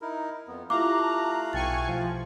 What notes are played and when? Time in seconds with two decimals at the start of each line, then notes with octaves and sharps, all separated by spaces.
0.02 D#4 E4 A#4
0.48 F2 B3
0.70 A3 E4 F4 G4 F5 A#5 D6 F#6
0.98 A5
1.53 B1 B2 G5 G#5 C#6 A6
1.88 F3